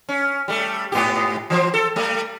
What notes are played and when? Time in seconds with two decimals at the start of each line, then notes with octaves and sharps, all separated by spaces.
0.09 C#4
0.48 G3 A3
0.92 G#2 B3 G4
1.50 E3 F3 C5
1.74 A4
1.96 G3 A3